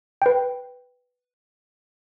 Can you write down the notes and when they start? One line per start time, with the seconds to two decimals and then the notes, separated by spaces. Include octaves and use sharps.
0.22 B4 G5